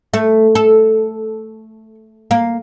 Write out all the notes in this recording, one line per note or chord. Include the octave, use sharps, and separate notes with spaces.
A3
A4
A#3